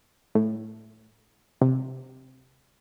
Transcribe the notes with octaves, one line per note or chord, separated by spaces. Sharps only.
A2
C3